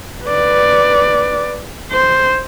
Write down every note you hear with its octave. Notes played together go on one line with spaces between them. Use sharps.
B4 D5
C5